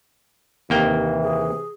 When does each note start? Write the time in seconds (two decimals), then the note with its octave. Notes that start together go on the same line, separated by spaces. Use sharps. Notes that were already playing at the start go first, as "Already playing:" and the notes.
0.70 D#2 C3 E3 A#3 G5
1.23 G#4